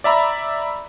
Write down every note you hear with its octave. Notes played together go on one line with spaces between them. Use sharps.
D5 E5 A#5 B5